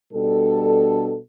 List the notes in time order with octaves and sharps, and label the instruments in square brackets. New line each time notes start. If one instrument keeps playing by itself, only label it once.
[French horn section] B2 G3 D4 A4